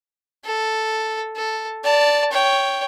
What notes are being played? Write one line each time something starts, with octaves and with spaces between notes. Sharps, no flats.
A4
A4
D5 A5
C#5 G5